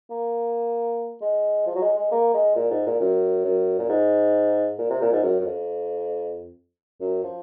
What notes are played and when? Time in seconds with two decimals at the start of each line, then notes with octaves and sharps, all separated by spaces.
0.10 A#3
1.22 G#3
1.66 F3
1.76 F#3
1.82 G#3
1.97 G#3
2.11 A#3
2.34 G#3
2.56 A#2
2.71 G#2
2.86 A#2
3.00 F#2
3.45 F#2
3.79 A#2
3.89 G#2
4.79 A#2
4.90 C3
5.01 A#2
5.12 G#2
5.23 F#2
5.40 F#2
5.45 F2
7.01 F#2
7.23 F3